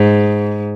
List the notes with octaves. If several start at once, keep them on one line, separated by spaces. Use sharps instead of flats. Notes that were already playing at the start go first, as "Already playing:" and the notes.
Already playing: G#2